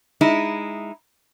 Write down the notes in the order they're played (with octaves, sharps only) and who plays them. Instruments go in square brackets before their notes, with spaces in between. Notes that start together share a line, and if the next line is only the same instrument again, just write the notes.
[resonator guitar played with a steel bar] G#3 D#4 E4